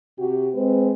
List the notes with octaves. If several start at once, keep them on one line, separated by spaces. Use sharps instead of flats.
C3 F#4 G4
G#3 C4 B4